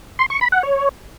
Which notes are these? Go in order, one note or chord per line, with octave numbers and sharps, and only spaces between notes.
C6
C#6
B5
F#5
C#5